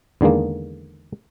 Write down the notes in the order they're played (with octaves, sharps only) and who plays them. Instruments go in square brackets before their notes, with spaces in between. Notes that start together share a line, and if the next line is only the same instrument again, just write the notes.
[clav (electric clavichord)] E2 D3 D#3 G#3 A#3